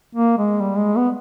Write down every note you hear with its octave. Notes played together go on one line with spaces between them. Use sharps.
A#3
G#3
G3
G#3
B3